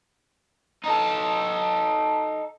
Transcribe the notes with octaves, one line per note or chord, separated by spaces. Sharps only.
D#4 A4